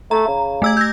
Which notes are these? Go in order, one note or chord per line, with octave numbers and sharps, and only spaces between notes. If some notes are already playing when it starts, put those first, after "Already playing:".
A3 A#5
C#3
A3 E6 G#6
G6 A#6